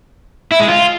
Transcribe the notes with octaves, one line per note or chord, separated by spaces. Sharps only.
E4
G#3
F4